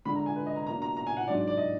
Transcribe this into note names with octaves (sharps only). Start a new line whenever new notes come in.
D3 G#3 D4 B5
A#5
G#5
B4
D#5
A#5
B2 A#3 D4 A#5
A#5
A#5
G#5
F#5
G#2 F#3 D4 D5
D5
D5
D#5